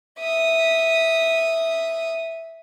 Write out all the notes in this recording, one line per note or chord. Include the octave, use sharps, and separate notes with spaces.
E5 D#6